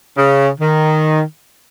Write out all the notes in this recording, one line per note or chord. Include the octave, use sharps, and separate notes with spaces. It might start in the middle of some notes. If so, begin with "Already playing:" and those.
C#3
D#3